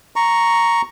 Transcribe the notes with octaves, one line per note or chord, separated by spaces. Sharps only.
A#5 C#6